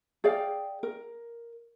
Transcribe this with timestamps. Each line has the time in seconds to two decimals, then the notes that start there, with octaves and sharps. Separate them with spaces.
0.24 G#4 D5 F5 G5
0.83 A#4